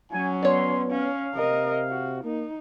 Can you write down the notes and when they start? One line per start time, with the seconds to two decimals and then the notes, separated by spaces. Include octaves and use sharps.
0.12 F#3 C#4 G#5
0.43 B3 C#5 D5 C6
0.91 C#4 F5
1.35 C3 A#4 D#5
1.89 F#4
2.24 A#3 D#4